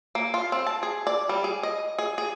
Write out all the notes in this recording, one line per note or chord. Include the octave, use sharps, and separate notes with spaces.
A#3
F4
C4
A5
G#4
D5
G3
G#4
D#5
G#4
G#4